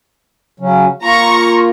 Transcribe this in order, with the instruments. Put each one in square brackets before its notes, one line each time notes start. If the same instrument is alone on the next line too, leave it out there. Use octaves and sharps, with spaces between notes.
[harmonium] C#3 F#3 C#4
[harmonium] A#3 F4 [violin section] A#5 C#6